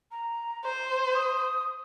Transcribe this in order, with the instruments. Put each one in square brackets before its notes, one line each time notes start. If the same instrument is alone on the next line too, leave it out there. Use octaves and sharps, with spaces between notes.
[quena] A#5
[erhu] C5
[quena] D#6